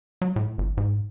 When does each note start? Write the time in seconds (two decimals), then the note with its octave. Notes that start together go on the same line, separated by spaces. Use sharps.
0.22 F#3
0.36 A2
0.58 G1
0.77 G#2